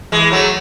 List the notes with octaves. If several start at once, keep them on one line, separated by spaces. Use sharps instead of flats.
E3 G#3
F#3 A3